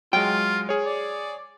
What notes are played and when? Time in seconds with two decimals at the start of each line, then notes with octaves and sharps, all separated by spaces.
0.13 F#3 G#3 F4 G5
0.69 G#4 C#5
0.86 D5